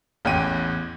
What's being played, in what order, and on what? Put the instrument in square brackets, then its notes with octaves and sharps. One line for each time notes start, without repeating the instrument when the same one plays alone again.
[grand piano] A1 E2 G5 D#7